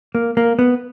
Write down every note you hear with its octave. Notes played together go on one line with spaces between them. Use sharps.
A#3
A#3
B3